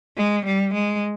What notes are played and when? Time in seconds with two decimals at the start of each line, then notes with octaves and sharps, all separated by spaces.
0.17 G#3
0.46 G3
0.74 G#3